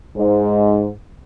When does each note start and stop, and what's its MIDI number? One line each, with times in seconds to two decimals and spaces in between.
0.16 0.90 44